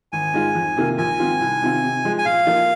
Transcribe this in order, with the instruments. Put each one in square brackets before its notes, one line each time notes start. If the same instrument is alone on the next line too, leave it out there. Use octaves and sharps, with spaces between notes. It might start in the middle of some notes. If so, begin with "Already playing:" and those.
[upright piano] G#1 [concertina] G#5
[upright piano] G#2 D#3 G#3 F4
F2
C3 D#3 A#3 F4
[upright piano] A#1 [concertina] G#5
[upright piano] G#2 D#3 C4 F4
C2
C3 D#3 C4 F4
C3
F3 G#3
[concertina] G#5
[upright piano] A#2 [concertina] F5
[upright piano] F3 A#3 D#4